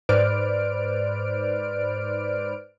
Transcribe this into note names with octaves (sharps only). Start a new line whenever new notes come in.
G#2 B4 C5 D5 F6 D7